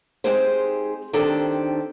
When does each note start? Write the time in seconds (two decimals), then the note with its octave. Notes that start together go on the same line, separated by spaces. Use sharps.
0.24 G#3 C4 D#4 G4 G#4 C5
1.13 D#3 C4 D4 G4 A4 C5